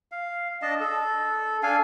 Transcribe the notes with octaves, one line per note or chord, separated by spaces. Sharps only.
F5
D4 D#5 A5
A4
D4 A4 F5 G#5